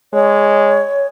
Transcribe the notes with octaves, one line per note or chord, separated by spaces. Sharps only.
G#3 C#5